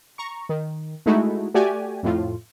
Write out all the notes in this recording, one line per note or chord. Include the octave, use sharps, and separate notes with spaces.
A#5 C#6
D#3
G#3 A3 D#4 E4 F#4
A3 F#4 G4 D5 G#5
F2 A2 F4